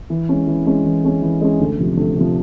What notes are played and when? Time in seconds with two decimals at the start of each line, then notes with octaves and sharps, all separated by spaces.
0.10 E3
0.29 G#3 C#4
0.47 E3
0.66 G#3 C#4
0.85 E3
1.04 G#3 C#4
1.22 E3
1.41 G#3 C#4
1.60 D2
1.79 C3 F3
1.97 D2
2.16 C3 F3